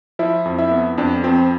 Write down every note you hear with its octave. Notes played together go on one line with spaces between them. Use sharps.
F3 E4 E5
F2
E4 E5
B3
F2 D4 D5
F3 C4 C5